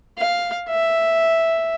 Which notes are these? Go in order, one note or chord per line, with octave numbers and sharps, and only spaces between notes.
F5
E5